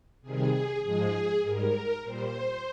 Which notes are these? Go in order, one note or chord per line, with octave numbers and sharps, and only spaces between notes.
C3 D#3 G3 G#4
G#2 F3 G#3 G#4
G#2 G3 A#4
A#2 G3 C5